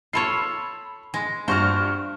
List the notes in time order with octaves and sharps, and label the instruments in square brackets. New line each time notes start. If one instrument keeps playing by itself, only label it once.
[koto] F4 A4 C#5 [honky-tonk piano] B5 C7
[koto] G#3
[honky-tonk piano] G2 C#6 F6 [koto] F#4 C5